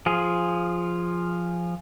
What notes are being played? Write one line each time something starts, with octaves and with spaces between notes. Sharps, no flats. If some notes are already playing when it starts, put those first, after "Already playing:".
F3 F4 G#4